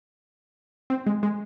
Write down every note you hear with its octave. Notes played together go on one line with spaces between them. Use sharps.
C4
G#3
G#3